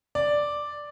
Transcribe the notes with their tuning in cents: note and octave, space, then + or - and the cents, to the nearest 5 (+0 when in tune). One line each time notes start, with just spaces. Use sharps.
D5 +0